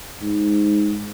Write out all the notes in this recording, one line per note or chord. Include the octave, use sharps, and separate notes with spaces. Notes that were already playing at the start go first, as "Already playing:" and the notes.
G#2